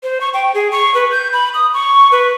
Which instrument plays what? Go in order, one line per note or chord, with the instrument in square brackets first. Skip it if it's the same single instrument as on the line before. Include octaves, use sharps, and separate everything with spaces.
[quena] C5
C#6
G5
G#4
C#6
B4
G6
B5
D#6
C#6
B4